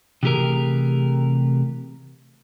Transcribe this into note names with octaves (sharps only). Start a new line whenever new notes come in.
C3 E3 A3 G4 G#4 A#4